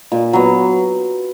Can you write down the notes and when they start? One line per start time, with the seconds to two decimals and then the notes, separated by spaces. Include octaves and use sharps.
0.12 A#2
0.33 F#3 B3